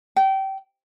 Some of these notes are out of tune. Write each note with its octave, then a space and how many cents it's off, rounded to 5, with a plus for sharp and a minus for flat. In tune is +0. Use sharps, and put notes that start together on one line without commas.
G5 -25